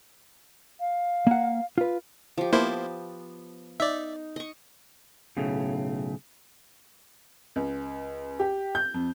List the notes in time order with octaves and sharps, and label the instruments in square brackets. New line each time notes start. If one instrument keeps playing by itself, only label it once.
[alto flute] F5
[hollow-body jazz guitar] A#3 F#5
F4 B4
[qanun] F3 G4
[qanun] F3 B3 A5 [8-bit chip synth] A#3 E4 C5
[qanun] D#4 [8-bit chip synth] D5 E5
[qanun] D#5 C#6
[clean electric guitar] B1 A2 C#3
[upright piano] C#2
G4
G6
F2